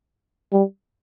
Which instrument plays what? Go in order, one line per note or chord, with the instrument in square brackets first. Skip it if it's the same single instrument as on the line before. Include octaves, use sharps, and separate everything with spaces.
[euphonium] G3